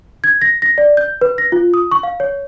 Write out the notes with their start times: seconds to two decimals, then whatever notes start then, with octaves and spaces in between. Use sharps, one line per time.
0.24 G#6
0.42 A#6
0.62 A#6
0.78 D5
0.97 G6
1.21 B4
1.38 A#6
1.52 F4
1.74 D#6
1.91 C#6
2.03 F5
2.20 C#5